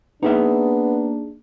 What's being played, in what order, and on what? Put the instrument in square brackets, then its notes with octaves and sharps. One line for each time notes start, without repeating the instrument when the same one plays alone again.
[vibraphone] A#3 [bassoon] B3 [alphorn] D4 [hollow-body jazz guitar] D#4 G#4 E5